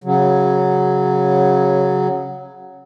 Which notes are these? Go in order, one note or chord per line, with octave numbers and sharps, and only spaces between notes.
C#3 F#3